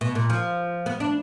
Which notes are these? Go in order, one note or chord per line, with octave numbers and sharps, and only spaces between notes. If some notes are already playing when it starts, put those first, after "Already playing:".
B2
A#2
F3
B3
D4